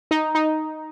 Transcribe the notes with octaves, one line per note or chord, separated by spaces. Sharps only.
D#4
D#4